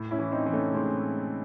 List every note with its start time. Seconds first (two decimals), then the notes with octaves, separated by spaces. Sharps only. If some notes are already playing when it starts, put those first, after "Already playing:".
Already playing: A2
0.11 C#4 E4
0.19 E3
0.32 C4 D#4
0.46 E3
0.53 A3 C#4
0.74 A2 G#3 C4